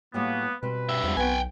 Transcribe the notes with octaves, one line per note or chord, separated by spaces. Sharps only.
A2 F#3 G3 A#3 B3
B2 G3 C4 B4
G2 E5
E2 F3 G3 B3
B1 B3 C4 F#4 G5 G#5